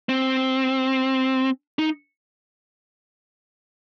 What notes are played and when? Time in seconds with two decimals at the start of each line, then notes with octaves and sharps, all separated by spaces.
0.09 C4
1.79 D#4